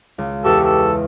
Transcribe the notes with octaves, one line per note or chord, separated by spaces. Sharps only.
C#2
E2 G4 A4 C#6
A4